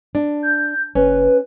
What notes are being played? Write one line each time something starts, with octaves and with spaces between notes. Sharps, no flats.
D4
G6
F#1 C#4 B4